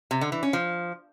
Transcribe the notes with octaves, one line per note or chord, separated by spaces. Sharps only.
C3
D3
E3
C#4
F3